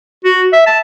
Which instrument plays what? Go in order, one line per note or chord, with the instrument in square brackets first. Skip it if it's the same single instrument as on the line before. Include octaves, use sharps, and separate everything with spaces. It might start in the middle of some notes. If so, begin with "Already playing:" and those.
[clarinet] F#4
E5
A5